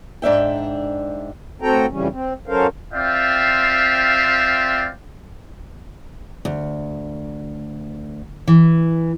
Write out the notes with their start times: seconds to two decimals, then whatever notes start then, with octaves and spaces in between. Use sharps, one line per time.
0.22 G#2 D4 E5 G5
1.62 A2 C4 F#4 A4 G5 A#5
1.90 F2 C#3 E3 G3 C#4
2.11 C4
2.48 F#3 C#4 A4 A#4 C5 F5
2.93 C4 F4 D5 E5 F5 G5
6.45 D2
8.48 E3